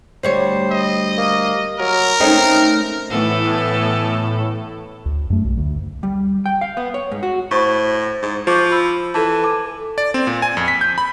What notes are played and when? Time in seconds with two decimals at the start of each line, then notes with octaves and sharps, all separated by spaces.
0.23 D2 G3 C5 C#5
0.71 D#5
1.17 A#3
1.79 F#3 A#4
2.20 A3 C4 C#4 D#4
3.10 A2 E3 B3 A4
5.06 D2
5.30 F#2 A3
5.45 B1
5.57 D2
6.03 G3
6.46 G5
6.61 F5
6.77 B3
6.94 C#5
7.12 G#2
7.23 F#4
7.51 A2 C5 C#6
8.23 G#2
8.47 F3 C#6 D6 G6
8.72 B5 E6
9.14 E3 A4 A5
9.44 G#5 D6
9.98 D5
10.14 C4
10.27 A#2
10.42 G#5
10.57 F2
10.68 B6
10.81 G6
10.98 B5